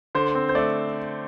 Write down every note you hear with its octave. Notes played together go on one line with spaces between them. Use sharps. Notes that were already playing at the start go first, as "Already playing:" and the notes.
D3 C5
C4
C5
A3 D5